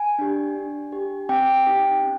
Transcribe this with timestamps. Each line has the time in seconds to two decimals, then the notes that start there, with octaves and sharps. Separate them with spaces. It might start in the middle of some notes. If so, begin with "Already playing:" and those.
Already playing: G#5
0.19 D4 G4
0.55 D4
0.92 G4
1.29 C4 G5
1.66 D#4 G4
2.03 C#4